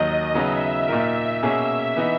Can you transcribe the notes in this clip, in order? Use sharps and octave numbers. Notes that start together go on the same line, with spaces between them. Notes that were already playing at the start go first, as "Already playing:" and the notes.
Already playing: D#2 D#3 F#3 D#5
C#3 F#3 B3 D#4 E5
A#2 A#3 D#4 A#4
B2 A#3 C#4 G#4 E5
E3 B3 D#4